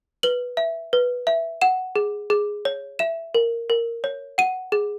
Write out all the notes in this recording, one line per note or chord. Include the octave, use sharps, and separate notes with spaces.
B4 F#7
E5
B4
E5
F#5 E7
G#4
G#4
C#5
E5 E7
A#4
A#4
C#5
F#5 D#7
G#4